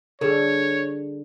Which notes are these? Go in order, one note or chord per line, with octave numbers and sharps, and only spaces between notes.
D3 G3 G#4 A4 C#5